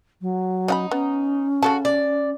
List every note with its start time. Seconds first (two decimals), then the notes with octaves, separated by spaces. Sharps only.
0.21 F#3
0.68 C#4 D#4 F#5 B5
0.91 B3 C#4
1.63 C#3 F#4 A4 A5
1.85 D5